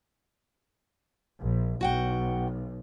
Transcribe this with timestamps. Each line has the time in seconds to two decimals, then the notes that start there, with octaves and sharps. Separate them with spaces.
1.39 A#1
1.81 B1 F#4 F#5 G5